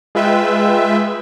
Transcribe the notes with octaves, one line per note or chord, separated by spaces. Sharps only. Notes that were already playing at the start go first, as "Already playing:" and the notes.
G#3 F4 B4 E5 G5